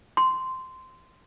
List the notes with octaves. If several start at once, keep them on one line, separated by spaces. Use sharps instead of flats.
C6